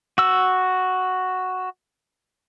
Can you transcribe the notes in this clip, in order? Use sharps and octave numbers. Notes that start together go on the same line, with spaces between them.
F#4 E6